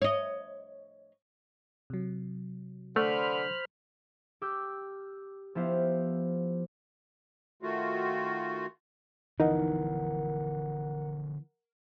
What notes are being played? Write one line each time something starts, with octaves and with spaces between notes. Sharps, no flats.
C#5 D#5
C3 F#3
D3 A3 C5 B5 F6
G4 D6 E6 F6 G6
F3 B3 E4 G4 C5 F5
D#3 A3 F4 F#4
D3 E3 F3 B3 D#4 A#4 F#5